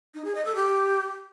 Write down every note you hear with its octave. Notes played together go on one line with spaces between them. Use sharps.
D#4
G#4
D#5
A4
G4